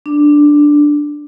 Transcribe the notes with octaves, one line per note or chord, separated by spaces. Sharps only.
D4